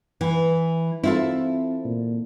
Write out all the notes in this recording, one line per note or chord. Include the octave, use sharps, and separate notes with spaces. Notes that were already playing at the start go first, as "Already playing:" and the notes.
E3
C4 E4 F4 A4
A#2